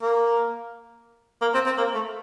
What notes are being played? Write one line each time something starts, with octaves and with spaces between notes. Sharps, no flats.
A#3
A#3
C4
C4
A#3
A3